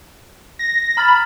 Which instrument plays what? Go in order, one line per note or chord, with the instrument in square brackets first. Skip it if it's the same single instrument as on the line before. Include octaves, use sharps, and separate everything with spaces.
[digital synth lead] A#6
[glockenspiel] A#5 F6 A6 [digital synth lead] B5